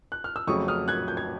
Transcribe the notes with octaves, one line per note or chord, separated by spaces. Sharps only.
F#6
F6
E6
F2 C#3 F#3 A3 C#6 D#6
D#6 F6
F#6 G#6
G6
G#6